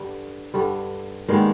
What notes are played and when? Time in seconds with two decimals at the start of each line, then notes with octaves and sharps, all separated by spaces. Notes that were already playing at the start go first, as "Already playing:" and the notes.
Already playing: G2 D3 G3
0.54 G2 D3 G3
1.28 D#3 G3 G#3 A#3 B3